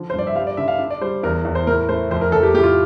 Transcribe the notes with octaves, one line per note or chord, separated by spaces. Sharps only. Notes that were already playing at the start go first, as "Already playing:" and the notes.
Already playing: D3 F3
G2 C5
D5
E5
G3 F5
D5
D3 E5
F5
D4
D5
G3 C5
E2 A#4
E2
C5
A2 A#4
A3 C5
F2 C5
A#4
F2 A4
G4
A2 G4
F4